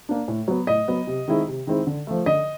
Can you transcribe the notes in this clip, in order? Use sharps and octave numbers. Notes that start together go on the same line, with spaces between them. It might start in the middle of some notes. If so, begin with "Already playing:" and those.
A#3 D4
A2
F#3 B3
A2 D#5
F#3 B3
C3
D#3 G#3 C4 E4
C3
D#3 G#3 C4 E4
D3
F3 A3
D3 D#5